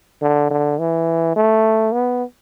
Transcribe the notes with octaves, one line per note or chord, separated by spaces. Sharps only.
D3
D3
E3
A3
B3